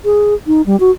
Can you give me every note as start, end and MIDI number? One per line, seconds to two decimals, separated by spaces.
0.05 0.34 68
0.47 0.62 63
0.66 0.79 55
0.80 0.91 66